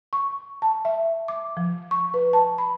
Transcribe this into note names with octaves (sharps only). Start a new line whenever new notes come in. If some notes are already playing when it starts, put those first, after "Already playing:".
C#6
A5
E5
D6
F3
C#6
B4
A5
B5